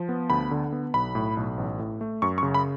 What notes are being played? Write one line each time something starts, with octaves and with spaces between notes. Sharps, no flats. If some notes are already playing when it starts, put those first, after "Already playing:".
Already playing: F3
B3
D2 B5
D3
B3
B1 B5
A2
B1
A1
A2
A3
F#2 C#6
C#6
C#3
B5